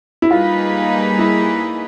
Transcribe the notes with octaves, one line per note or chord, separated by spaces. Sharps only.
E4
G3 A#3 D#4 F4 G#4 B4
E4